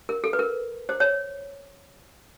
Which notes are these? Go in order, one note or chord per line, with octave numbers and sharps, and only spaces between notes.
A#4
A4
B4
A#4
C5
C#5